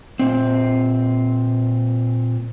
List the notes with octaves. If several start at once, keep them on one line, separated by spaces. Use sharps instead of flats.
A#2 C4